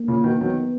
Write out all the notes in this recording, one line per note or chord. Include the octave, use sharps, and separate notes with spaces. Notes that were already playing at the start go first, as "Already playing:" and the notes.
Already playing: A#3
A#2 C#3
B2 D#3
D#3 F#3 B3